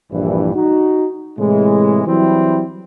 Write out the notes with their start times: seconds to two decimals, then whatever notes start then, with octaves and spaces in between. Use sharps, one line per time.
0.11 A#1 G2 E3
0.54 D#4 F#4
1.39 A2 C3 E3 G#3
2.07 E3 F#3 G3 C4 E4